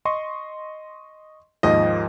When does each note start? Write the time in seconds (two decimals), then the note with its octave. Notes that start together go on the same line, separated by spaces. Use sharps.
0.05 D#5 C6 C#6
1.63 D#2 G#2 F3 D#5